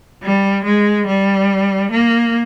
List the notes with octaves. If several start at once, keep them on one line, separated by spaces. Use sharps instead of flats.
G3
G#3
G3
A#3